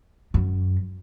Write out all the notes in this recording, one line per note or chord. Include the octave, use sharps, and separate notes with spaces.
F#2